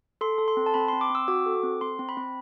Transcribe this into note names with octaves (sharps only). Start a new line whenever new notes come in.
A4 C6
A4
C6
C4
A5
C4 B5
C4 C6
D6
C4 E6
F#4 D6
A4
C4
C4 C6
C4
B5
C4